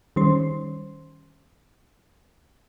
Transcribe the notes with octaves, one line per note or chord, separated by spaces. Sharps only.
D#3 G3 C#4 C5 C6